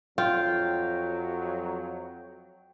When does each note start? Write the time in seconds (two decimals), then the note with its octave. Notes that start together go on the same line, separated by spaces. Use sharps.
0.18 F2 F#3 F4 G5